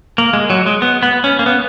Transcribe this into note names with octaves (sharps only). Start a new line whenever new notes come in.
A#3
G#3
F#3
G#3
B3
B3
C#4
A#3
B3